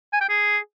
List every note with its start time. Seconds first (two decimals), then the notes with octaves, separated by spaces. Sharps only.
0.13 G#5
0.21 G5
0.29 G#4